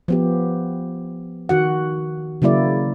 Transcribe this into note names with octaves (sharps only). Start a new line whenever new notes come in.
F3 B3 G4
D#3 F#4 F#5
C#3 F#3 A#3 E4 D5